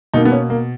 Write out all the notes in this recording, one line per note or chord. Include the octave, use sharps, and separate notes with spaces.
B2 A#3 D#4
B3
C#4
A#3